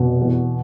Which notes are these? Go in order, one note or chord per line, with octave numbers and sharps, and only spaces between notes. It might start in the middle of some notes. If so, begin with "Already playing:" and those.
Already playing: F1 B2
E2